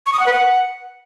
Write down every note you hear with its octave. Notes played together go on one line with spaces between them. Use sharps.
C#6
D#6
F#5
B4
F#5